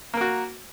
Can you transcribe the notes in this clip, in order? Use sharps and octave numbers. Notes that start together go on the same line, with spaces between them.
A#3 F#4 A#4